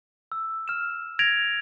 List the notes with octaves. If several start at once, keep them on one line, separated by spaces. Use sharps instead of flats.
E6
F6 E7
G#6 A#6 D7 F7